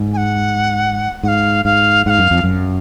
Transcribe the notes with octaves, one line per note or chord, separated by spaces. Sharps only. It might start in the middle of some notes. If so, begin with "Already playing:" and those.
Already playing: G#2
G#5
F#5
G#2 F5 F#5
G#2 F5
G#2 F5 F#5
F#2
F2
F#2